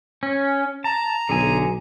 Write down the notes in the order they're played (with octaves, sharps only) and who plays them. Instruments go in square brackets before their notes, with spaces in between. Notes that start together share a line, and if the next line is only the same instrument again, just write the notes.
[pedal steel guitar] C#4
[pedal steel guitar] A5 [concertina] A#5
[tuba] B1 [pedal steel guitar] D3 G#4 G#5